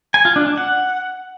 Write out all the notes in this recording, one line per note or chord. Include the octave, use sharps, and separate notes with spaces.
G#5
F4
D4
D4
F#5